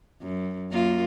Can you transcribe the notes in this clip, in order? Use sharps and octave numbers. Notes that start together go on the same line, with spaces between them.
F#2
F#2 A#3 F4